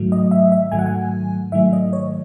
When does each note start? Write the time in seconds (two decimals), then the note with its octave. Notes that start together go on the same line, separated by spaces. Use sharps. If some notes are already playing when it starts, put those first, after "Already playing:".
Already playing: G#2 D#3 F#3 A3
0.12 D#5
0.31 E5
0.52 E5
0.72 G#2 D#3 F#3 A3 G#5
0.79 F#5
0.86 G#5
1.52 G#2 D#3 F#3 A3 E5
1.73 D#5
1.93 C#5